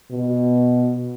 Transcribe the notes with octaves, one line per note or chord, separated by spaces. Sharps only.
B2